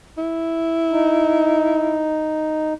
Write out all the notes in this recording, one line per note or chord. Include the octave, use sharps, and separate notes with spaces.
E4
D#4